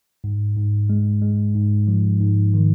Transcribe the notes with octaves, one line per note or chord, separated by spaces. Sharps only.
G#2
G#2
G#3
G#3
G#2
F3
G#2
D#3